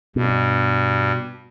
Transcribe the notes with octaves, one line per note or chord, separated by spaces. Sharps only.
G2 B2